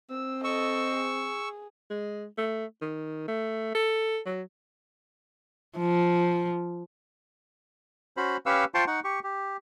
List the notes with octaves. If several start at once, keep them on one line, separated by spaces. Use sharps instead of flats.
C4 E6
A4 D#5 C#6 E6
G#4
G#3
A3
D#3
A3
A4
F#3
F3
C#4 F#4 C5 B5
C#4 G4 B4 F5 C#6 E6
F4 C5 G5 A5 C6 C#6
D#4 F#5 C#6
G4 C#6
G4